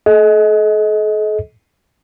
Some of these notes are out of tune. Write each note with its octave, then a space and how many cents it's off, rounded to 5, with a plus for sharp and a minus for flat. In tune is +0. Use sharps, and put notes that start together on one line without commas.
A4 -45 D#5 +25